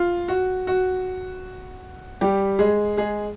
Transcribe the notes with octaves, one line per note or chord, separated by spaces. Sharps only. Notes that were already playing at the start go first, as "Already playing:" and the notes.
Already playing: F4
F#4
F#4
G3 G4
G#3 G#4
G#3 G#4